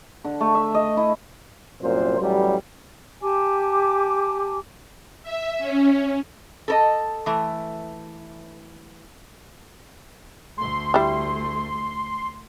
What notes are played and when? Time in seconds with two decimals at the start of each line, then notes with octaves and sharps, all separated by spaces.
0.25 D3
0.41 A3
0.55 E5
0.74 D#5
0.97 E4
1.81 C2 F#2 A#2 C5
2.19 A1 F#3 G3
3.22 G4 G#5 A5 D6
5.23 E5
5.59 C#4
6.68 A4 A#4 D#5
7.26 E3 A3
10.58 D2 A3 C6
10.94 G3 E4